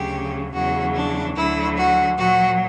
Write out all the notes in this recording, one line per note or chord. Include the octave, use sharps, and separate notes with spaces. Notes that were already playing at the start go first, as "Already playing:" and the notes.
Already playing: D2 C#3 F#3 G4
E2 C#3 F#3 F#4
D4
D2 D3 F#3 E4
F#4
A#2 F#3 F#4